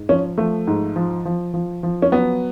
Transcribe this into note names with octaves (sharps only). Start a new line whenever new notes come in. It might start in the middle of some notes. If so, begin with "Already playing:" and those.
Already playing: G#2
F3 C#4
F3 A3
G#2
F3
F3
F3
F3
C#4
F#3 B3